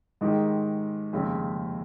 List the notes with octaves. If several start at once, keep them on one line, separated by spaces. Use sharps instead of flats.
G#2 D#3 G#3 D#4 G4
F1 D#2 C#3 G#3 C4